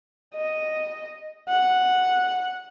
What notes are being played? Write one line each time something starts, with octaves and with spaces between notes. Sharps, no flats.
D#5
F#5